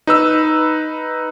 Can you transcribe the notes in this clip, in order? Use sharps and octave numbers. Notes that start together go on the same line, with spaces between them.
D#4 B4 E6